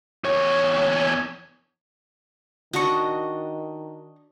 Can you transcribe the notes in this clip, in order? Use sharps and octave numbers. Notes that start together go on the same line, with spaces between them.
E2 C#5
D#3 D4 F#4 D#5 C#6